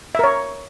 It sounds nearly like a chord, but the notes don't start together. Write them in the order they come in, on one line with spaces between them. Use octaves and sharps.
E5 A#4 C#5